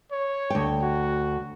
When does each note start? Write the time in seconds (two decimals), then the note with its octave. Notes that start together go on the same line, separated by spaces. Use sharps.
0.12 C#5
0.50 D2 G5
0.82 F#4